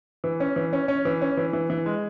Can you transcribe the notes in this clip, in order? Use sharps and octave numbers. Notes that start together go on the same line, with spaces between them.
E3
C#4
E3
C#4
C#4
E3
C#4
E3
E3
E3
G#3